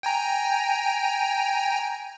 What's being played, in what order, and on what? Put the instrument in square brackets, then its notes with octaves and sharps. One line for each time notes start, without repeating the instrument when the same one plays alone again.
[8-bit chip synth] G5 G#5 A#5